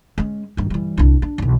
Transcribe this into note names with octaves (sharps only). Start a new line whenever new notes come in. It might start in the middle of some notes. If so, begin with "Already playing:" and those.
G#3 C#4
G2 D#3
E3 G3
C2 D4
D4
B1 E3